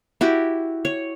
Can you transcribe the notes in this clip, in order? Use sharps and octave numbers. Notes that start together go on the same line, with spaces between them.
E4 F#4 G4
C#5